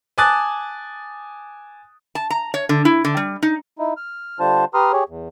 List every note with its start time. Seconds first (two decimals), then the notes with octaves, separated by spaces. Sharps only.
0.18 G#5 A5 D6 D#6 F#6 A6
2.15 A5
2.30 A#5
2.54 C#5
2.69 D3
2.85 E4
3.05 D3
3.17 G3
3.42 D#4
3.79 D#4 E4
3.97 F6
4.40 D3 G3 D4 F4 C5 A5
4.74 G4 B4 A#5 C6 D#6 F6
4.93 G4 G#4 C#5
5.09 E2